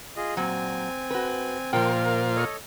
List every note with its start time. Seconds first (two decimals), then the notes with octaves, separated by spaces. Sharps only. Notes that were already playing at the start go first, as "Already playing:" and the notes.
0.17 F4 G#4 D#5
0.37 A#2 F#3 C4 G#5
1.10 F#4 B4
1.73 A#2 F3 F4 A#4 C5 G5
2.36 A4 C#5 D#5